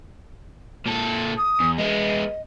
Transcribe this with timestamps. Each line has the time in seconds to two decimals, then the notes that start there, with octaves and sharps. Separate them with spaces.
0.86 A#2 A4
1.38 D#6
1.60 E2
1.78 G#3 B3 D#5